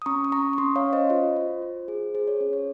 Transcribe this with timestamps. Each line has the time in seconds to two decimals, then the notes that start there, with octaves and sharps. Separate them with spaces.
0.02 D#6
0.06 C#4 A#5 C#6
0.24 D#6
0.32 C#4 A#5 C#6
0.53 C#6
0.58 C#4 C6 D#6
0.76 C#5 F5
0.84 C#4
0.93 C5 D#5
1.10 F4 C5
1.36 F4
1.62 F4
1.88 G#4
2.15 G#4 C5
2.27 C#5
2.40 C#4 C#5
2.53 C#5